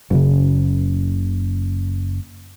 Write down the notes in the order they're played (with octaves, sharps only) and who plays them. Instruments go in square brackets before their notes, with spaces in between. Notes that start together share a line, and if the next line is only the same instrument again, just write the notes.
[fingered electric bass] F#1 C#3